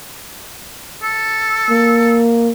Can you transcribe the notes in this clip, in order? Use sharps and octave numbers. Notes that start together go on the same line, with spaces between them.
A4
A#3